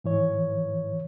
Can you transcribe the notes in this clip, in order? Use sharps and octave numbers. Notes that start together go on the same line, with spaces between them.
G#2 E3 C#5